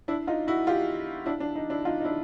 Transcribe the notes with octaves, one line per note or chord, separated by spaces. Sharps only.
D4 E4
D#4 F4
E4 F#4
F4 G4
D4 E4
D4
D#4
D4 E4
D#4 F4
D#4
D4 E4